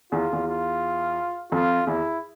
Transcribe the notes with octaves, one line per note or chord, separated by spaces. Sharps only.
E2 F4
E2
F4
F2 F4
E2 E4